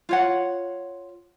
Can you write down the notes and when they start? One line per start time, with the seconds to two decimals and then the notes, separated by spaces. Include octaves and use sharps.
0.09 F4 C#5 F#5